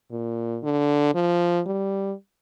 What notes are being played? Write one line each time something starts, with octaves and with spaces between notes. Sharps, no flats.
A#2
D3
F3
G3